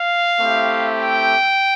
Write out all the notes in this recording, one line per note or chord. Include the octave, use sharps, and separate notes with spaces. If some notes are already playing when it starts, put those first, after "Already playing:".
Already playing: F5
A3 C4 E4 G4
G5